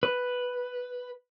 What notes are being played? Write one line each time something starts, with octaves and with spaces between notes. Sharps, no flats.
B4